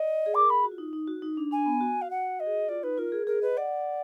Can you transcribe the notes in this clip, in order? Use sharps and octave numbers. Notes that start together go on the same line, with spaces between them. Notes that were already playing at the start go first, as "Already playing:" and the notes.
Already playing: D5 D#5
G#4
A#4 D6
G#4 B5
F#4
F4
D#4
D#4
F#4
D#4
D4
D4 G#5
B3
F#4
F5
F#5
D#5
G#4
F#4
F4 D5
D#4 B4
F4 A#4
G#4
G#4 A#4
B4 D#5
D5 F#5